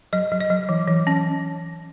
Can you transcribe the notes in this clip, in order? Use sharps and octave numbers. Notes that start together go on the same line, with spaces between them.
F#3 D#5
F#3
D#5
F#3
E3
E3
C#4